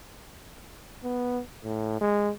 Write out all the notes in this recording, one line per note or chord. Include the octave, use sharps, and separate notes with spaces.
B3
A2
G#3